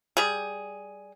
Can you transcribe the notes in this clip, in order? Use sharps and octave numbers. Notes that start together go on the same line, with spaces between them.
G3 G#4